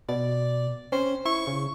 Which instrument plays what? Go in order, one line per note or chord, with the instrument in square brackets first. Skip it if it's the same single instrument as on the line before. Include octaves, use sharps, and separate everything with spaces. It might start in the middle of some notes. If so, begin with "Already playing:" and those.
[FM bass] B2 [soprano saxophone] D5
[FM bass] C#4 [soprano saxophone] C5
[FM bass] E4 [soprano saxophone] C#6
[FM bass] C#3